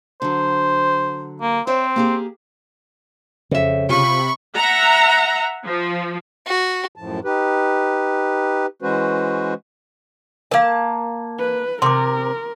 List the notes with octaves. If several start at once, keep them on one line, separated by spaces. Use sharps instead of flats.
D3 F#3 C5
A#3
C4 C5 C#5 E5
A#3 G4 G#4
F2 C#3 E5
C3 F4 B5 C#6
E5 F#5 A#5
F3
F#4
F#2 A2 F3 A5
D#4 G4 B4
E3 G#3 C#4 F#4 B4 C5
A#3 A#4 F5 A5
B4
C3 A#4 C6 D6